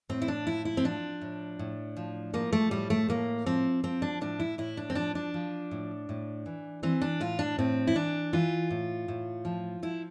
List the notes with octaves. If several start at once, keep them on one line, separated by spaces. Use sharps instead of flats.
A2 C4
E4
D4
F3 E4
E4
C4
F3 D4
A2
A2
F3
F3 A#3
A3
A2 G3
A3
A2 A#3
F3 C4
F3 C4
D4
A2 D4
E4
A2 E4
D4
C4
F3 D4
D4
F3
A2
A2
E3
E3 C4
D4
A2 F4
D4
A2 C4
E4
E3 D4
E3 F4
A2
A2
F3
F3 E4